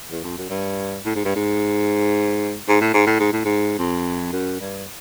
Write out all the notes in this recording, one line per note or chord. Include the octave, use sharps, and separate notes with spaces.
E2
F2
F#2
G2
A2
G#2
G2
G#2
G#2
A2
G#2
A2
G#2
A2
G#2
F2
F#2
G2